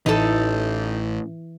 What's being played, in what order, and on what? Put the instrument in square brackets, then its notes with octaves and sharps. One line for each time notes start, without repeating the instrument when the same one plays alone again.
[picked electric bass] A1 [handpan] E3 [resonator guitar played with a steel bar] D#4 A4